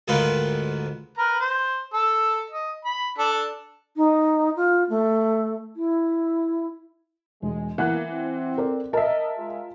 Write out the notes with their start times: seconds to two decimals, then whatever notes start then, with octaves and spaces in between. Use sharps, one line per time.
0.08 D2 G#2 D#3 F4 B4 C6
1.18 A#4 B4 A#5
1.40 C5
1.94 A4 E6
2.50 D#5
2.85 B5
3.18 D4 A4
3.96 D#4
4.56 F4
4.89 A3
5.76 E4
7.42 E1 G#3
7.78 E3 A#3 B3 F#5 F#6
8.12 C4
8.57 A4 A#4 D5
8.93 A#4 D#5 E5 A5
9.36 G#3 F4 G#4